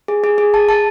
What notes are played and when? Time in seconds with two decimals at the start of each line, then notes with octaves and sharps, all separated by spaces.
0.08 G#4
0.24 G#4
0.38 G#4
0.54 A5
0.69 A5